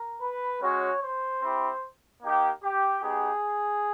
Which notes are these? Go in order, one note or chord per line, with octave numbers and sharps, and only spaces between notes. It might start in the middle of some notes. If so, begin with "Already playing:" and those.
Already playing: A#4
B4
G#3 C#4 F#4 C#5
C5
C4 E4 G4
A#3 D#4 G4
G4
B3 D#4 G4 G#4